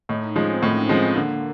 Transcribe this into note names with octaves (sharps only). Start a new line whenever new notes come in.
A2 D#4
F3 G#3 C#4
C4
A2 C#4
C#4
F3 G#3 C4
D3 A#3